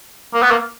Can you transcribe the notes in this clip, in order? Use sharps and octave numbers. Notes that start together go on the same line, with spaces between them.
A#3
B3
A#3